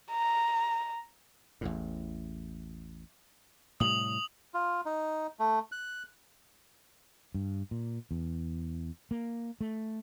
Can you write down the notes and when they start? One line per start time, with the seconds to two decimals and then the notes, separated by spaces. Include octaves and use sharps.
0.11 A#5
1.61 A1 E2 A2
3.80 A2 C3 G3 D#6 F#7
4.54 F4
4.86 D#4
5.39 A3
5.72 F#6
7.34 G2
7.71 A#2
8.11 E2
9.11 A#3
9.61 A3